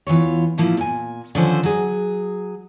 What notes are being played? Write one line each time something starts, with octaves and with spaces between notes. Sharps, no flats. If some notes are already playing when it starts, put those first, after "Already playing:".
E2 E3 F4 C#5
A2 F3 A#3 E4
A#2 G#5
D3 D#3 F3 C#4 A4 C5
F#3 G#4